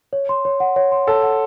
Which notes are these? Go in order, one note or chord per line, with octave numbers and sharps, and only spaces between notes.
C#5
C6
C#5
F#5
C#5
C6
A4 C#5
F#5